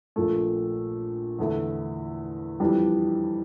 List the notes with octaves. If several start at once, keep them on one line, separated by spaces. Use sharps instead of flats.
A#1 A#2 A3
E2 D3 A3 E4
F2 E3 G3 D4 G4